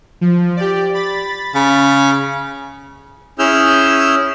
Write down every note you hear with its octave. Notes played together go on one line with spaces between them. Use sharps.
F3
G4 D5
B5 A6
C#3
C#4 E4 G#4 E6 F6 G6